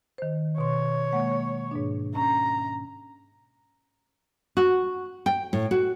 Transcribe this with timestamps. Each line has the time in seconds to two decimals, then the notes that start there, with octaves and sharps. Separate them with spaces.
0.18 D#3 C5
0.58 B2 C#5 C6
1.13 G#3 A#3 F#5
1.71 G#2 B2 D4
2.15 C#4 A#5
4.57 F#4
5.26 G5
5.53 A2
5.71 F#4